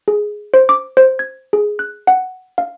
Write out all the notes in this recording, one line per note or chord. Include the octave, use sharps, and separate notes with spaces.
G#4
C5
D6
C5
G#6
G#4
F#6
F#5
F5